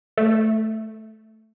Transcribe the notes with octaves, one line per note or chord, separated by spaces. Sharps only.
A3